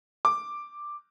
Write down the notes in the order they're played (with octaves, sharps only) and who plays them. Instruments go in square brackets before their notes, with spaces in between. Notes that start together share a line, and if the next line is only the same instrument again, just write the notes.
[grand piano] D6